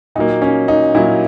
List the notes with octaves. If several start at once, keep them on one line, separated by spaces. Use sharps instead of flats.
A#2 F#3 A#3 D#4
C#4
D#4
A#2 F#3 A#3 E4